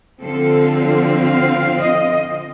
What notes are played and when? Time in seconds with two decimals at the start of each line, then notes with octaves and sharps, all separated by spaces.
0.22 D3 F3 C4 F4 A4
1.26 F5
1.78 D#5